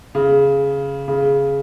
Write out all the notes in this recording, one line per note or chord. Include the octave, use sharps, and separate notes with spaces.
C#3
C#3